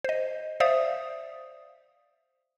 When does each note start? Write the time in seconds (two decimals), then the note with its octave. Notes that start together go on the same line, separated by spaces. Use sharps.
0.04 C5 D#5
0.60 C5 D5 E5 F5 D#6